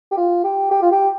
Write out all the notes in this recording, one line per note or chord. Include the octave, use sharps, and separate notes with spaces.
G4
F4
G4
G4
F4
G4